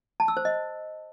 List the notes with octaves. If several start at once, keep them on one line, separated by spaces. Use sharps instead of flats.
A5
E6
C5
D#5